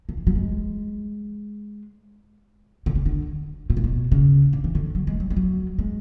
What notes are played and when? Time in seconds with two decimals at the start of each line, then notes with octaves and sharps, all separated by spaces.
0.09 D3
0.17 E3
0.27 F#3
0.35 G#3
2.86 D3
2.95 C#3
3.06 D3
3.70 B2
3.77 A2
3.84 B2
4.12 C#3
4.53 D3
4.64 E3
4.75 D3
4.95 F#3
5.07 G#3
5.20 F#3
5.30 G#3
5.36 F#3
5.79 G#3